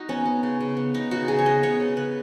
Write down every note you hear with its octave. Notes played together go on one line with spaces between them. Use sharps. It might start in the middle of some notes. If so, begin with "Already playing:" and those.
Already playing: D#4 F#4
B3 C#4
B3
C#3
C#3
B3
B3 D#4
C#3 F#4
C#3 G#4
C#5
B3 D#5
B3 C#5
C#3
C#3 B4